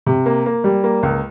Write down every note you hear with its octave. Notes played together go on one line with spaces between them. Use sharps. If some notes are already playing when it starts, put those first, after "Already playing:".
C3
A#3
A#3
G3
A#3
C#2